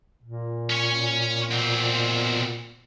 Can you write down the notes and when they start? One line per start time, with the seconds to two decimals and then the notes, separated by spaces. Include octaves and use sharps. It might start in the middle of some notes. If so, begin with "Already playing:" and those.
0.23 A#2
0.70 C#4 C#5
1.51 B2 C4